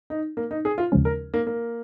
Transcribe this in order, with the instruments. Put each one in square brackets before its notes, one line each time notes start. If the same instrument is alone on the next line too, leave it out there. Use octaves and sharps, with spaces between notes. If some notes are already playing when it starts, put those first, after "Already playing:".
[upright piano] D#4
A#3
D#4
G#4
F4
[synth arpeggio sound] D#2 C#3 F3 G#3 C#4
[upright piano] A#4
A#3
A#3